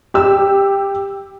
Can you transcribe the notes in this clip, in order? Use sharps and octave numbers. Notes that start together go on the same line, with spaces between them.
G4 E6